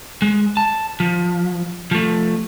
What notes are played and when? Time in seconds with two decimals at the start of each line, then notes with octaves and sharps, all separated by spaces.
0.22 G#3
0.57 A5
1.00 F3
1.91 F3 A3